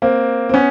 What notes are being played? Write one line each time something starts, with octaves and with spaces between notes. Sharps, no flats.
A#3 C4
C4
B3 C#4